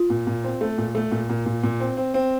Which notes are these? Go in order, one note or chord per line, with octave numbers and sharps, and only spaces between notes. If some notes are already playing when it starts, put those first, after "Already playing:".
Already playing: F4
A#2
A#2
C4
A3
A#2
A3
A#2
A#2
A#2
A#2
C4
C4
C4